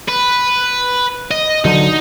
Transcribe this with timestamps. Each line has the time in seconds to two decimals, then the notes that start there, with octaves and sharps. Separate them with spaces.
0.09 B4
1.31 D#5
1.65 D3 F#3 D#4